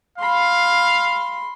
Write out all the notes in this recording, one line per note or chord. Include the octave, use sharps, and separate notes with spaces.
F5 B5 C6